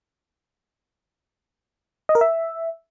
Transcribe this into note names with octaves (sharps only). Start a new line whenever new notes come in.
D#5
A#4
E5